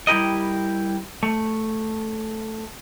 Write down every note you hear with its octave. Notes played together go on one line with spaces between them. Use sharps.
G3 E4 G4 A#4 D#5
A3